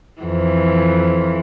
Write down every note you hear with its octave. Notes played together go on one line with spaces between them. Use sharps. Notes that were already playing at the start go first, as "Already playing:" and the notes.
F2 E3